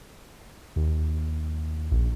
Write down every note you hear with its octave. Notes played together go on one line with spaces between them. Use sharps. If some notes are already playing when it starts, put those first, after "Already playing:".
D#2
A#1